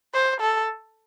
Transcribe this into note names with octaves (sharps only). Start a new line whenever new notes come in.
C5
A4